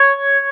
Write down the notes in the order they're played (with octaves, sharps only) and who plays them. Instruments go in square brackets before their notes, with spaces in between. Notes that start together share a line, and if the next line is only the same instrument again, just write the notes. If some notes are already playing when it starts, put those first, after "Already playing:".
Already playing: [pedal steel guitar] C#5